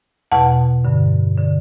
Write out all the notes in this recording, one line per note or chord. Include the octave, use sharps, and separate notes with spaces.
E2 B2 F#5 A5
G2 D3
D3